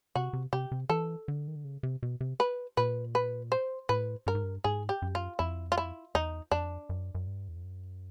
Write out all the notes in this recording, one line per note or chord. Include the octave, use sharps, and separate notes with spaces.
C3 F#4
C3
C3 G4
C3
E3 A4
D3
D#3
D3
C#3
C3
B2
C3
B4
A#2 B4
B4
C5
A2 B4
G2 A#4
G#2
G2
G#2 G#4
G4
F#2
F4
F2 E4
F4
E4
E2 D#4
F2 D4
F#2
F#2
G2
E2
F2
F#2